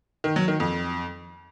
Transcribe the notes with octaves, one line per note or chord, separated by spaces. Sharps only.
D#3
F#3
D#3
F2